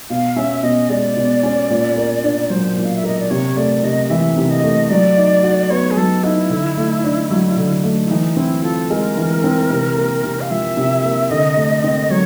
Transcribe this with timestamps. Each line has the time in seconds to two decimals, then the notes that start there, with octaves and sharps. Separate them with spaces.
0.10 B2 F5
0.36 C#4 E5
0.63 B2 D#5
0.90 G#3 D5
1.16 B2
1.43 C#4
1.70 A#2
1.96 A#3
2.24 D4
2.50 F#3 C5
2.77 A#2
2.84 F5
2.96 E5
3.03 A#3 D#5
3.18 D5
3.30 C3 C#5
3.57 A3 D5
3.83 C3 D#5
4.10 E3 E5
4.37 C3
4.50 D#5
4.63 A3
4.90 F#3 D5
5.17 D#4
5.44 F#4
5.70 B3 C#5
5.91 G#4
5.97 F#3 A4
6.24 D#4 E4
6.50 D3
6.77 A3
7.04 D4
7.31 F#3
7.57 D3
7.83 A3
8.05 E4
8.10 E3 D#4
8.37 C4 E4
8.63 F4 A4
8.90 G#3 A#4
9.17 E3
9.44 C4
9.70 C3
9.97 A#3
10.24 C3
10.41 F5
10.51 F3 E5
10.77 C3
11.04 A#3
11.31 D3 D#5
11.57 A3
11.84 C4
12.10 F#3 C#5